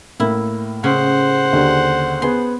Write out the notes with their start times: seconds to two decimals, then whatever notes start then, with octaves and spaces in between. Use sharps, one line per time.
0.20 A2 A#3 E4
0.84 C#3 C5 F#5
1.53 D#2 D3
2.22 B3 G#4 C6